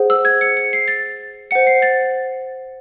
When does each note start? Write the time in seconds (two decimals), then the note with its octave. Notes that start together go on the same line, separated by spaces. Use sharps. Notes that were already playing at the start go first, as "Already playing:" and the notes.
Already playing: G#4 C5 F#5
0.10 E6
0.25 G#6
0.41 C#7
0.57 C#7
0.73 C7
0.88 A6
1.51 C5 F#5 C#7
1.67 C7
1.82 A6